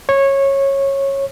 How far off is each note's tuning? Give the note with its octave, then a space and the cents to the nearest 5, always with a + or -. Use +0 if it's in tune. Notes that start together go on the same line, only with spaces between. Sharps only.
C#5 -15